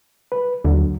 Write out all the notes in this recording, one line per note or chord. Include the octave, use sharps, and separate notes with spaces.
B4
D#2 D3 F#3